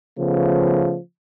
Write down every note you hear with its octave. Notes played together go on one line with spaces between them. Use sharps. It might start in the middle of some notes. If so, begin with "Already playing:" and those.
C#3 F3 A3 B3